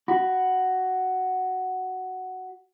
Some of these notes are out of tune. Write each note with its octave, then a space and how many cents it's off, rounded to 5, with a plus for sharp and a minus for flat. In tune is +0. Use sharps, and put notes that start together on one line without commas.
F#4 +5 B5 +0